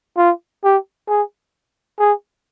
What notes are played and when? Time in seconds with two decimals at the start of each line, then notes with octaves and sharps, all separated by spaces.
0.17 F4
0.64 G4
1.09 G#4
1.99 G#4